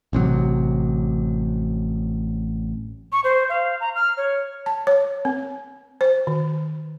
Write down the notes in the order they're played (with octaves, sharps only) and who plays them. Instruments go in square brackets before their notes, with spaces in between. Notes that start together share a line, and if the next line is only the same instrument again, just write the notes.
[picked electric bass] A1 C3 D#3 F#3
[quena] C#6
C5
F5
A#5
F6
C#5
[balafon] A5
C#5
C4
C5
D#3